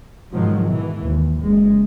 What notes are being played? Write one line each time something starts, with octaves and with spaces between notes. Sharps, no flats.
G#2 B2 D#3 F3 F#3
B2 E3
D#2
F#1 G#3